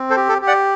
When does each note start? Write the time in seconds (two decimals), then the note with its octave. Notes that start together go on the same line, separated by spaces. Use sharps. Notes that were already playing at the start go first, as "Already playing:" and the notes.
Already playing: C4
0.10 A4 C5
0.16 G4
0.29 A4
0.42 G4
0.47 D5 F#5